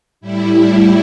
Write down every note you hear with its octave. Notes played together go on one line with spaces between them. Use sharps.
A2 G3 E4